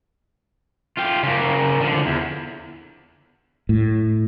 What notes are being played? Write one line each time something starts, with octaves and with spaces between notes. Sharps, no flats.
F4 G4
C#3 A#3
D3 F3
E2
A2